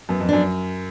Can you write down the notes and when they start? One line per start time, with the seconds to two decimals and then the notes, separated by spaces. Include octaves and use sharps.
0.09 F#2 B3
0.20 F2
0.29 F#2 D4